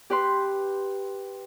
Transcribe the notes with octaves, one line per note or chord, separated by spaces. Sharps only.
G4 B4 C6